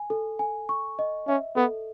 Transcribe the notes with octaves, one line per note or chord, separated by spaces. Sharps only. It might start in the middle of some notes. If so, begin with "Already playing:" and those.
Already playing: G#5
A4
G#5
C#6
D#5
C#4 E5
B3 A4